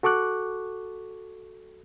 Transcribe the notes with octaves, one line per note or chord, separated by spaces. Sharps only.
F#4 A4 C#6 D6 F#6